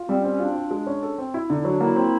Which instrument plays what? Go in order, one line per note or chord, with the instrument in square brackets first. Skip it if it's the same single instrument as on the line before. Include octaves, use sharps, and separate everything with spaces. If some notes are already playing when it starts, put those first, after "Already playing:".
Already playing: [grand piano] F4
[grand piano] G3 [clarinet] C4
[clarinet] C#4
[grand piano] C4
[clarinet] C#4
[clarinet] D4 [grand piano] F4
[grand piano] F4
G#3
C#4
A4
C4
E4
[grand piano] D3 [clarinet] D#4
[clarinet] E4
[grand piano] F#3
[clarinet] D4
[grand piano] A#3 [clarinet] E4
[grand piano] C4